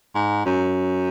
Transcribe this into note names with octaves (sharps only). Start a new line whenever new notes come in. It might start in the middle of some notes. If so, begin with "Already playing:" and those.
G#2
F#2